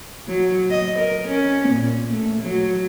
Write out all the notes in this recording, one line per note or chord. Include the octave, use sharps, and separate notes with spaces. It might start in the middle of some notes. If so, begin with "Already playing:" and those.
F#3
D#5
A#4
C#4
A#2
A3
F#3